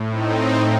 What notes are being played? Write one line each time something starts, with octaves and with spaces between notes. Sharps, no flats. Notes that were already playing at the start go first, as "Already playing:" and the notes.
Already playing: A2
C4 D#4